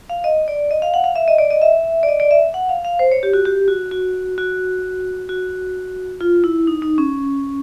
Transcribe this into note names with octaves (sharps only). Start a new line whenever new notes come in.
F5
D#5
D5
D#5
F5
F#5
F5
E5
D#5
D5
D#5
E5
D5
D#5
D5
E5
F#5
F5
F5
C5
C#5
G4
F#4
G4
F#4
F#4
F#4
F#4
F4
E4
D#4
D#4
C#4